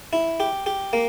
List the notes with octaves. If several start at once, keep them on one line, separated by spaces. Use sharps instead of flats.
E4
G4
G4
A#3